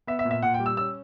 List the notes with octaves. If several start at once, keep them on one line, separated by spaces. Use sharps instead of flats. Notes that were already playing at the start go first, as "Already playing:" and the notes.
B3 E5
E5
A#2
E5
A#2 F#5
G5
G3
E6
C#4 E6